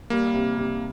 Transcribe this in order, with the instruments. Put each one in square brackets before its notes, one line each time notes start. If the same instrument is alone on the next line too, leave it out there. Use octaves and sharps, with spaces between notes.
[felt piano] G3 [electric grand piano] A#3
[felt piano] C3
C3